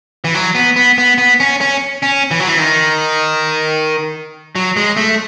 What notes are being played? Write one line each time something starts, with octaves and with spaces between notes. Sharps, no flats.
E3
F#3
B3
B3
B3
B3
C#4
C#4
C#4
E3
F#3
E3
D#3
F#3
G#3
A3